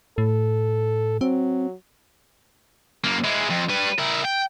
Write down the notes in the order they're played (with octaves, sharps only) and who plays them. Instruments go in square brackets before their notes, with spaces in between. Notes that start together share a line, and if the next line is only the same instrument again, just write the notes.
[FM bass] A2 [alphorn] A4
[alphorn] F#3 [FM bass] C4
[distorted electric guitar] F#2 A#3
G#3 E4
F2
G3 B4
E4 A#4
G5